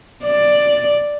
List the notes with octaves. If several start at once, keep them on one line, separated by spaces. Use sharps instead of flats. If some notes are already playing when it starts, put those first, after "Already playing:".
D5